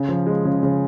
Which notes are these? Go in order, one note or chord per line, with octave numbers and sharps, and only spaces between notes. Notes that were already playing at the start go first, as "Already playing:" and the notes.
Already playing: C#3
F3
G#3
C#3
C#3